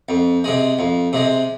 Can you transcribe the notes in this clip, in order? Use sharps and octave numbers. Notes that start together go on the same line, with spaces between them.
F2
C3 G#3
F2
C3 G#3